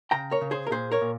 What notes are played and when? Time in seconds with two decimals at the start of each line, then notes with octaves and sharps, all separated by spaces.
0.11 C#3 G5 A#5
0.31 A#4 C#5
0.41 C#3
0.51 G#4 C5
0.67 A#4
0.71 A#2 G#4 C5
0.92 A#4 C#5
1.01 A#2